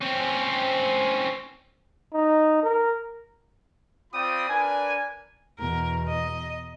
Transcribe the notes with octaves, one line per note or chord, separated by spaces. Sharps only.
C4 C#4
D#4
A#4
C4 F4 D5 G5 B5 D#6
D4 A#4 B4 D5 G#5
E2 B2 A#4
D#5